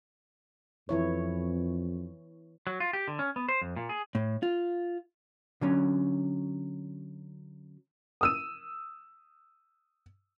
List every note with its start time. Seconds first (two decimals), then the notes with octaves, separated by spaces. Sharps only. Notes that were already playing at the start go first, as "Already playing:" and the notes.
0.89 F2 E3 E4 C#5
2.67 F#3
2.80 F4
2.93 G4
3.08 D3
3.19 C#4
3.36 B3
3.49 C5
3.62 F2
3.76 A#2
3.89 G#4
4.15 A2
4.43 F4
5.61 D3 F#3 C#4
8.21 D#6 E6 D#7